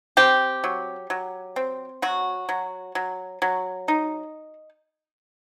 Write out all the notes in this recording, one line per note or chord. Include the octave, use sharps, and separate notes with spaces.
C4 G4
F#3
F#3
C4
F#3 F#4
F#3
F#3
F#3
D#4